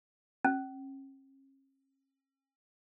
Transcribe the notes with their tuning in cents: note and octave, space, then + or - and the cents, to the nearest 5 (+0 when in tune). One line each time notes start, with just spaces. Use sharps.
C#4 -40